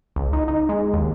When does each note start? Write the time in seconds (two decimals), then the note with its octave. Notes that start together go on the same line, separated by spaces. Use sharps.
0.16 C#2
0.33 D#4
0.48 D#4
0.69 G#3
0.93 D#2